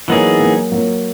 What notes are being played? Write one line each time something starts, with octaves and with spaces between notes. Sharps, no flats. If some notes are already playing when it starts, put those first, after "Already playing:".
E3 F#3 A#3 B3 D#4 G#4
F#3 A#3
F#3 A#3